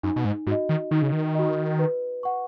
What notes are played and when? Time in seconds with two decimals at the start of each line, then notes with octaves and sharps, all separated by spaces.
0.03 F#2 D#4
0.16 B2
0.25 G#2
0.47 G#2 F#4 D#5
0.69 D#3
0.91 D#3 D#4
1.02 C#3
1.12 D#3
1.35 F#4 D#5
1.79 B4
2.23 F#5 C#6